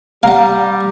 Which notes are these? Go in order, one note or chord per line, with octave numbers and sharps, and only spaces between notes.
G3 F5 F#5 A#5